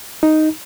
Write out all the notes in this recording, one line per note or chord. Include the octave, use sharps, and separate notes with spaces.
D#4